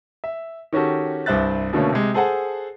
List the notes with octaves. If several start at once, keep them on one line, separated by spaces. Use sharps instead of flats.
E5
D#3 C#4 F#4 G4 A4
C2 G2 C5 E5 F#6 A6
B2 D3 A3 A#3 C#4
C3 G#3
G#4 A4 C5 F#5 G#5 A5